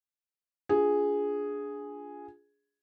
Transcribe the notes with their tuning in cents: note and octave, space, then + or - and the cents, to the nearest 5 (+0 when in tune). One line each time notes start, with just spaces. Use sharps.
D4 -20 F4 +10 G#4 +0